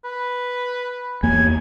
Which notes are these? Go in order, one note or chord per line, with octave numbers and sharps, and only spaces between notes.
B4
E2 A#3 G#5